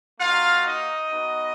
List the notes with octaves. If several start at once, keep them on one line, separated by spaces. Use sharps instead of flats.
A#3 D#4 F4 F#4 F5
D#4 D#5
B3 D#4 F#4